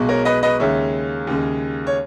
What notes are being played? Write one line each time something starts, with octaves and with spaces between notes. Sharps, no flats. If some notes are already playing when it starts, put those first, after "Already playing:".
Already playing: B1 B2 G#3
A#4 C#5
B4 D#5
B4 D#5
D#2 C#3 G#3 C#5 E5
D#2 C#3 G#3
C#5